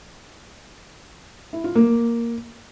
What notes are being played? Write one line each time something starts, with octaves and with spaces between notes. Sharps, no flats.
E4
F4
A#3